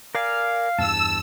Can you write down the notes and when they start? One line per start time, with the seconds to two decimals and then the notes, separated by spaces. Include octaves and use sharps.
0.15 A#4 D5 F5 G#5
0.79 E2 G2 A5 E6